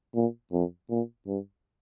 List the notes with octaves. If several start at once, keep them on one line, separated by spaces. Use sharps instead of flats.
A#2
F2
A#2
G2